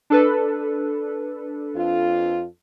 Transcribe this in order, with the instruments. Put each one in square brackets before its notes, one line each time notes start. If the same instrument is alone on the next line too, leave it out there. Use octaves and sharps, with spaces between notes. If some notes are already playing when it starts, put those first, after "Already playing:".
[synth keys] D4 A4 B4
[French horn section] F2 F4